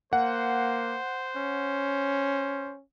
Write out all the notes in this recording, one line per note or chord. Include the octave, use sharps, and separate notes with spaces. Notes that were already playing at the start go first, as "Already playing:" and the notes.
A#3 C5 F#5
C#4